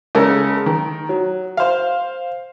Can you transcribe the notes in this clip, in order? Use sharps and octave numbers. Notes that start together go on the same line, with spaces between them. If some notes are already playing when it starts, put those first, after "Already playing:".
C#3 G#3 A4 A#4
D#3
F#3
C5 F5